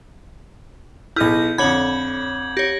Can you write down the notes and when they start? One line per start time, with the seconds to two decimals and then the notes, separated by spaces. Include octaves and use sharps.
1.16 B1 E4 G#4 F6 G6 A#6
1.58 F2 D3 C#5 B5 G#6 F#7
2.57 G4 C#5 A#6